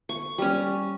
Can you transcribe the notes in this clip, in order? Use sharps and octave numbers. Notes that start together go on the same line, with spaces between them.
C#6
G3 C#4